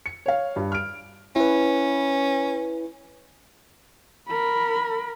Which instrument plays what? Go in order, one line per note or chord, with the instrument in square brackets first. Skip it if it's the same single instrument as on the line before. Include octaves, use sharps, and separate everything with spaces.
[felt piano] C#7
C#5 F5
G2
F6 D7
[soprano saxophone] C#4 [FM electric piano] E4 B4
[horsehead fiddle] A#4 B5